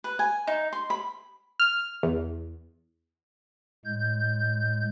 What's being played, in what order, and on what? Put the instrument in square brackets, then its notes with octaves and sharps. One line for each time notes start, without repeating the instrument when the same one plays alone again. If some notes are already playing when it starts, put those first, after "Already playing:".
[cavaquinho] B4
G#5
D#4
C6
B5
[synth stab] F6
E2
[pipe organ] A2 G#3 G6